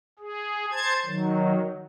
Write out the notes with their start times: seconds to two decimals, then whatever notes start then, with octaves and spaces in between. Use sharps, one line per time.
0.19 G#4
0.71 C5 A5 G#6
1.06 D#3 F#3